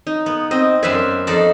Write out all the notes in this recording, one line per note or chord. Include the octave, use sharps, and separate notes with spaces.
D#4
B3
C4 D#5
F#2 B4 C5 D5 E5 G#5
F2 D#4 D5 A5